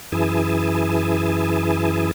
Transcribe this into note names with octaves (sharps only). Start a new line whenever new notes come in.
F#2 E3 E4 G#4 G#5 A5